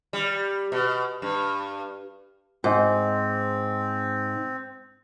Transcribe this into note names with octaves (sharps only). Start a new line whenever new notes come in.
G3
B2
G2
G#2 C4